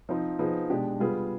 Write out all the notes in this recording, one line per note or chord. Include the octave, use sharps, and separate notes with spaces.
F3 C4 D#4
F3 B3 D#4 G#4
B2 G#3 D4 G4
G3 B3 F4 G#4